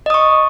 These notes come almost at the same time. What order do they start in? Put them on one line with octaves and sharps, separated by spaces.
D#5 D#6 C#6